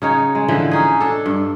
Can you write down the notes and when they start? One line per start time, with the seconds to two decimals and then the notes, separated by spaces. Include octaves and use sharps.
0.02 C#3 D#4 C#5
0.35 G#3
0.48 D3 E3 F3
0.71 C#4 D#4 G#4
1.01 D4 A4
1.26 G2